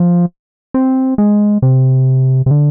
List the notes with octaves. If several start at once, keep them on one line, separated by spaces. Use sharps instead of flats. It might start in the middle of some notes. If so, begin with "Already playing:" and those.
Already playing: F3
C4
G#3
C3
C3
D3